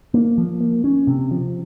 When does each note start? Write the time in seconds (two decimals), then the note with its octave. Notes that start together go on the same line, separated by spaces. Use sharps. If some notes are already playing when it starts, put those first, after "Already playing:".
0.14 A#3
0.38 F3
0.61 A#3
0.84 C#4
1.07 C3
1.31 F3